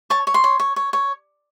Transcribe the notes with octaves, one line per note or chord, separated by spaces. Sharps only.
C#5 A5
C#5
C6
C#5
C#5
C#5
C#5